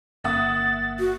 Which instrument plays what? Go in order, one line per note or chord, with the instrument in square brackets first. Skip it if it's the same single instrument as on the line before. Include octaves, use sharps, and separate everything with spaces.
[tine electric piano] G1 A#3 [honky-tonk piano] E5 F#5 D#6 [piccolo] A6
[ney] F#4